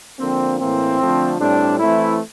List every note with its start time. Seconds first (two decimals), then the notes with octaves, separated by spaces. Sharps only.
0.19 D3 F3 A#3 C4
0.59 A2 E3 A#3 C4
0.99 D3 F3 A3
1.39 A2 G3 C4 D4
1.79 E3 A3 C4 E4